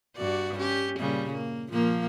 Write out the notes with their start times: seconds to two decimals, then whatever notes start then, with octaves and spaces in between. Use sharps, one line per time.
0.16 G2 F#4 D5
0.58 C#4 G4
0.98 A#2 C#3 G3
1.32 A#3
1.69 A#2 F3 A#3